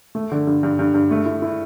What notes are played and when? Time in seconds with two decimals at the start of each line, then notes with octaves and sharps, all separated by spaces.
0.15 A3
0.32 D3
0.47 G2
0.63 G2
0.79 G2
0.94 G2
1.11 A3
1.26 E4
1.42 E4